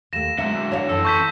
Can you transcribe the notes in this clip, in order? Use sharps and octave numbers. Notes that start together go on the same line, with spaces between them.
D#2 A3 A#6 E7
D3 F#3 G#3 E5
C#5 E5 F#5
F#2 E3 A4 E6
A5 C#6 G6 B6